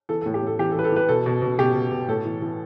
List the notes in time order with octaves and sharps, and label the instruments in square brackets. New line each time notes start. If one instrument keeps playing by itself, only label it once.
[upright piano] E3 A4
A4
A2
G4
A2 A4
E3 G4
A4
E3 B4
A4
E3 B4
B2 A4
B2
B2
B2 G4
B2
B2
A2 A4
E3
E3